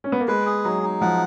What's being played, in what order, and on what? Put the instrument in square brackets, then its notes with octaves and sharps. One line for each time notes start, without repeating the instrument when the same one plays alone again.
[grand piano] C#4
B3
A#3
[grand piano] G#3 [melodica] B4
[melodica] G#4
[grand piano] F#3 [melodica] D#4
[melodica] D#4
[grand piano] F3 [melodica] F#5